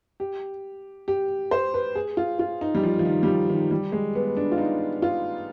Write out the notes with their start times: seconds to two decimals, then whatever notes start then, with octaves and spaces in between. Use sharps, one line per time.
0.20 G4
1.08 G4
1.51 C5
1.74 B4
1.95 G#4
2.17 F4
2.39 F4
2.61 D#4
2.75 G3
2.83 F3
2.99 F3
3.05 D#3
3.23 G3
3.27 F3
3.49 D#3
3.71 G3
3.92 G#3
4.15 B3
4.37 D4
4.52 F4
4.58 D#4
5.02 F4